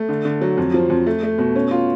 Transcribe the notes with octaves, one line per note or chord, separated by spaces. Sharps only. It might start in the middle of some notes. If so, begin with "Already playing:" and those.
Already playing: A3
D3
D3
F#3
F2
F3
F2
A3
A3
B2
C#4
F4